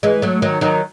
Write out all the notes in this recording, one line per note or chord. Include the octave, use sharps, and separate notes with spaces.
E3 G#3
F#3 A3
D#3 F#3
D#3 F#3